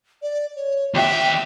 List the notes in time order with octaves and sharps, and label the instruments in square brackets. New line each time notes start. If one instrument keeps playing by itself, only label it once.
[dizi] D5
C#5
[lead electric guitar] D#2 E5 [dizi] G5